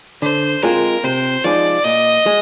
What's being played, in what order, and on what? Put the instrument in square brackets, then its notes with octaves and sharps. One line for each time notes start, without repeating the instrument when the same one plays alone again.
[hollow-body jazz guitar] D3 [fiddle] C5
[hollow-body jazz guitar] G#3 C4 F4 [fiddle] A#4
[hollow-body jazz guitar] C3 [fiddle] C5
[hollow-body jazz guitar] F3 G#3 D#4 [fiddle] D5
[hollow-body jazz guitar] A#2 [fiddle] D#5
[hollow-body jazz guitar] G#3